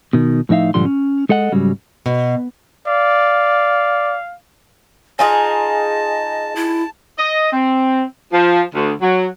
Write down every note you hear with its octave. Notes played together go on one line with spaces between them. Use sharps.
B2 D#3
A2 F3 D#4 E5 F5
B1 G#2 D3 F3 G3 C6
C#4
G#3 A4 D#5 F#5
G#2 C#3 F#3 G3
B2
D5 F5
D#4 F4 G#4 D#5 G#5 A5
E4
D#5
C4
F3
D2
F#3